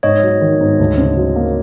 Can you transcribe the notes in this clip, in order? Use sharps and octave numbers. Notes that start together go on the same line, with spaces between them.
G#2 C#5 D#5
F#3
D#3
G#2
D2
C#3
F#3
A#3